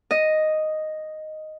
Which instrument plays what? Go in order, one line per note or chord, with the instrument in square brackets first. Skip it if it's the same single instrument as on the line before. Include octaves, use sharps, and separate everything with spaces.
[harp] D#5